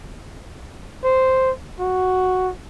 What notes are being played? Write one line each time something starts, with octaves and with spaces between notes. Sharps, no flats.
C5
F#4